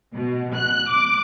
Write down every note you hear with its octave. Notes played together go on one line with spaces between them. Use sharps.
B2
F#6
D6